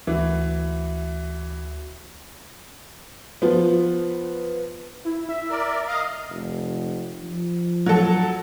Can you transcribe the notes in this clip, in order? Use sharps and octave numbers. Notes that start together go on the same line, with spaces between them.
D2 E3 F#4
F3 B3
E4
E5
A#4 D5
D#5 F5
F1
F3
F#3 A4